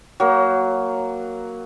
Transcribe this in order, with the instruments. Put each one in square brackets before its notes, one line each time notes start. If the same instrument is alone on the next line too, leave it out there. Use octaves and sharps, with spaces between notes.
[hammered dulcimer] F#3 A#3